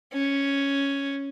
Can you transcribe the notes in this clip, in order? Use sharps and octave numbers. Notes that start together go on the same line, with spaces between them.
C#4